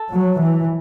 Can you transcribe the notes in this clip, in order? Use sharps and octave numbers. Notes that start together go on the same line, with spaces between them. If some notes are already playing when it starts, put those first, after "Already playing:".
Already playing: A4
F#3
E3